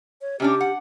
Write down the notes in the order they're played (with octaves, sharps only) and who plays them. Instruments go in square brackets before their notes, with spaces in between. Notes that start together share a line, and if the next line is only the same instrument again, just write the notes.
[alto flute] C#5
[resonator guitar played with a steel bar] C3 C#4 D4 [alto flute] G4
[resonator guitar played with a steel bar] F#5